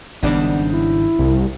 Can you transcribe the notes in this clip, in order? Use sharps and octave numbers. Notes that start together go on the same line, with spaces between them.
G#1 G#2 C#3 G3 B3 D4 D#4
E4
C2